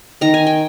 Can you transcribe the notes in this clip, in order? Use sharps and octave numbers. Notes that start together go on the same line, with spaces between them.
D#3 A#5
G#5
G5